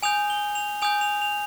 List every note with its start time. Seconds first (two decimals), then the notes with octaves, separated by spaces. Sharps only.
0.03 G#5 D#6 G6 F7
0.30 G7
0.55 F7
0.82 G#5 D#6 G6 F7
1.01 F7
1.22 F7